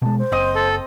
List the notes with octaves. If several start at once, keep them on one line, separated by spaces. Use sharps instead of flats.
B2 G#3 A5
C5
F#1 C4 D#5 D#6
A4